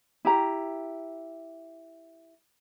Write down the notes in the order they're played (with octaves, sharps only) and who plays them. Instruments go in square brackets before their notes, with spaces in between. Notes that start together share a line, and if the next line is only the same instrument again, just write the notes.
[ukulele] E4 G4 A#5